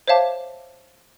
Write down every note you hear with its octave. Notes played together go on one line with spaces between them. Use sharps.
C5 C#5 E5 F5 A5 D6